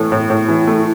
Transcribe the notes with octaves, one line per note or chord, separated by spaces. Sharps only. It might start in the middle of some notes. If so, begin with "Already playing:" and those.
Already playing: A2 E3 A3
A2 E4
A2
E3
A3